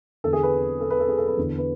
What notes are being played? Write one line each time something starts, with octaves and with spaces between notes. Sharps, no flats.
E2 D3 A4
G#4
B4
A4
B4
A4
G#4
A4
B4
E2 D3
B4